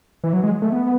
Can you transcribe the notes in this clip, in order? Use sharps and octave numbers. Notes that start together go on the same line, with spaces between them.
E3
F#3
G#3
A3
B3